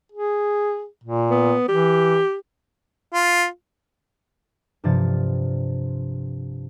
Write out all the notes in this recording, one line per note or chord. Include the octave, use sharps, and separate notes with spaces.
G#4
A#2
B3
E3 G4
F4
G2 C3 F3 A6